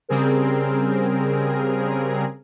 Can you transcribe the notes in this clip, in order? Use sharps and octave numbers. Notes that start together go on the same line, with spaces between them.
C#3 G3 C4 G#4 A#4